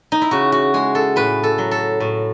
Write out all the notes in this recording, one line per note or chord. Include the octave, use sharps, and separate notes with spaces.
D#4
E4
C#3 F#4
F#4
G#3 G#4
A4
A2 B4
A4
F#3
A4
A2